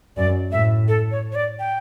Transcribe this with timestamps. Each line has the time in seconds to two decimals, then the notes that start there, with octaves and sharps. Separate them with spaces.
0.17 F#2 D5
0.52 A2 E5
0.88 A4
1.11 C#5
1.32 C#5
1.35 D5
1.59 G5